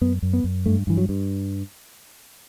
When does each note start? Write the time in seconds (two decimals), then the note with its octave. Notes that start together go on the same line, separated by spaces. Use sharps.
0.01 F#2 B3
0.22 F#2
0.33 B3
0.44 F#2
0.66 G2 A3
0.87 G2 E3
0.97 F#3
1.09 G2